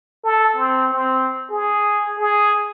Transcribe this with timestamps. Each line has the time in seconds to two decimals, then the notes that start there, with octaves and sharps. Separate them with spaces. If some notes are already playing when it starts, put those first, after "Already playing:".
0.24 A4
0.57 C4
0.92 C4
1.50 G#4
2.19 G#4